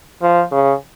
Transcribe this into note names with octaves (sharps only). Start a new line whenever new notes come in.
F3
C#3